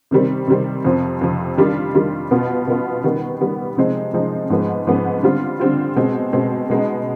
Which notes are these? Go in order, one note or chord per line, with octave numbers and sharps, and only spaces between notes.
C3 D#3 G3 C4
C3 D#3 G3 C4
F2 C3 F3 C4
F2 C3 F3 C4
D#3 G3 D4 F4
D#3 G3 D4 F4
B2 B3 F4
B2 B3 F4
D#3 G3 B3
D#3 G3 B3
C3 F3 G#3 C4 D#4
C3 F3 G#3 C4 D#4
G#2 F3 G#3 B3
G#2 F3 G#3 B3
D3 G3 C4 F4
D3 G3 C4 F4
B2 G#3 C4
B2 G#3 C4
B2 G#3 B3 D#4